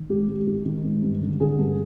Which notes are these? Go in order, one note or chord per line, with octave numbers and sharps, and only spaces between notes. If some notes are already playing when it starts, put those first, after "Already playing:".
Already playing: D#3
G#2 G4
G#2
D#3 G4
D#3
G#2
G2
D3
D3 G#4
G2